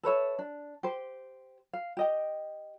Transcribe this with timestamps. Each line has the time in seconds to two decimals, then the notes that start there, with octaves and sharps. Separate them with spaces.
0.03 A4 B4 C#5 E5
0.39 D4
0.83 G4 C5
1.73 F5
1.97 G4 D#5 G5